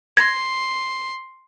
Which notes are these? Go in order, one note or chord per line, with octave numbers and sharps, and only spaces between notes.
C6 G#6 A#6